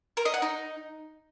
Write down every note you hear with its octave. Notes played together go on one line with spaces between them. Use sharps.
A#4
D#5
F#5
D#4